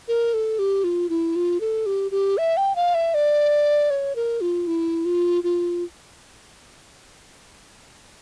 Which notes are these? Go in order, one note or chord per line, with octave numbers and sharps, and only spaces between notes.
A#4
A4
G4
F4
E4
F4
A4
G4
G4
E5
G5
F5
E5
D5
C#5
A#4
F4
E4
F4
F4